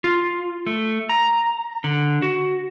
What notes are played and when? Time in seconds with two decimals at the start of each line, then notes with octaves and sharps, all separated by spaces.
0.04 F4
0.67 A3
1.09 A#5
1.84 D3
2.22 F#4